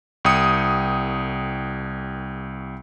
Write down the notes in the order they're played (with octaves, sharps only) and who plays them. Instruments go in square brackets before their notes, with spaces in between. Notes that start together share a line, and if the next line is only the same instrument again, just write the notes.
[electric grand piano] C2 G5 D#6 C#7